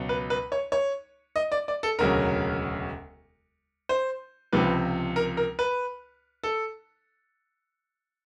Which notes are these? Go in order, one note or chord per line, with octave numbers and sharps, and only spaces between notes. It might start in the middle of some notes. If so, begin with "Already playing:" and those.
Already playing: C#2 B2 F#3
B4
B4
C#5
C#5
D#5
D5
D5
A4
E1 D2 C#3 F#3 A#4
C5
C#2 C3 F3 B4
A#4
A#4
B4
A4